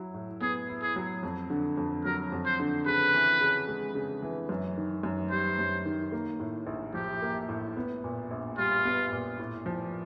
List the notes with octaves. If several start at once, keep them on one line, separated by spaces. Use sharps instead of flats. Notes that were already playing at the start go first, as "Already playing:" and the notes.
Already playing: F#3 E4
A2
B3 G#4
E4
G#4
F#3
F2
D3
F2
F#3 A#4
F2
C5
D3
C#3 B4
E3
C#3
G#3
C#3
E3
F#2
D#3
F#2
G3 C5
F#2
D#3
A#3
A2
A#1
F3 G4
A#3
A2
B3
A#2
A#1
G3 F4
B3
A#2
A2
F3